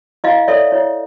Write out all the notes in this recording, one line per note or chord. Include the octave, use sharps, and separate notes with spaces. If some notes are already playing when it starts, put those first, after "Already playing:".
E4 D#5 F5
A4 C#5 D5 E5
E4 C#5